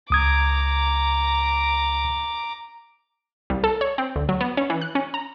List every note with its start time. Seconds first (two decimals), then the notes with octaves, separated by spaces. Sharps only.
0.10 C#2 A#5 D6 D#6 G#6
3.50 C2
3.64 A4
3.81 C#5
3.98 C4
4.16 D2
4.29 F#3
4.41 B3
4.57 C#4
4.70 E3
4.81 F#6
4.95 C#4
5.14 A#5